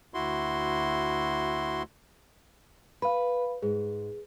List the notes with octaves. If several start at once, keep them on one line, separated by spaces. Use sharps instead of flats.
D2 E4 F#4 C6
B4 F5 B5
G#2 G#4